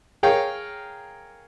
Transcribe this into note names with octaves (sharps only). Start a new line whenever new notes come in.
G#4 A#4 C#5 F5 G5